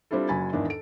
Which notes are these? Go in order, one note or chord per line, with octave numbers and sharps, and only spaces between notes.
G3 C4 D4 E4 F4 A4
F#1 F#3 G#5 B5 A6
E2 G#2 D#3 D4 E4
A4 D7